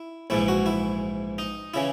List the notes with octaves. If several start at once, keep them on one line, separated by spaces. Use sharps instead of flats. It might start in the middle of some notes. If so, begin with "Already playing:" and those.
Already playing: E4
A#1 G#2 E3 E4
F#4
E4
D#4
C#3 E3 E4